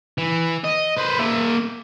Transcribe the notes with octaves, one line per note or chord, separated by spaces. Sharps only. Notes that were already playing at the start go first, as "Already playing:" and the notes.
E3
D#5
B4 C5
A#3 E5